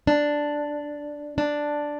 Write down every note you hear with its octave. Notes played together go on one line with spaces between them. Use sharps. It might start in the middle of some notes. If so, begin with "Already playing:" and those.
D4
D4